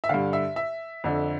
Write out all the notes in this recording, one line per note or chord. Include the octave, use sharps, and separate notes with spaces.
E5
G2 D3 F5
E5
E5
F2 D3